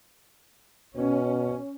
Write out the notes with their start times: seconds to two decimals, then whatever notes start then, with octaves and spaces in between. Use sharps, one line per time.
0.97 B2 C#4